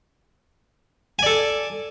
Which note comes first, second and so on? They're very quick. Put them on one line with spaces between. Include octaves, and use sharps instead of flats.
G#5 D5 A4